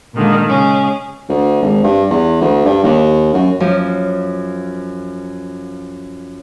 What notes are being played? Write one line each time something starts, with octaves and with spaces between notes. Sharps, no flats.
A#2 D3 D#3 G#3 A#3
C#3 G#3 C#4 G#4
D2
G#1
G2
E2
D2
G2
D#2
F#2
F#2 F3